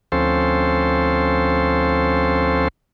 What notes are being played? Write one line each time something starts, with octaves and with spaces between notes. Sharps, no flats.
D2 F3 C4 C#4 A4 C5